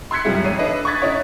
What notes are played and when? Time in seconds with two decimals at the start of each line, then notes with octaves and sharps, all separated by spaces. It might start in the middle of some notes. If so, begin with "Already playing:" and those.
0.11 C6 E6 F#6 G#6 B6 C#7
0.25 F#2 C3 F3 G3 G#3 E4
0.44 A1 C#5 D#7
0.59 D4 A4 B4 D#5 E5
0.85 C#6 D#6 F#6 G#6 A6 B6
1.02 C#4 D#4 E4 C#5